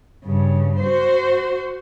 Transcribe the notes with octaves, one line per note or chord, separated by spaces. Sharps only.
G2 C#3
F#4 C5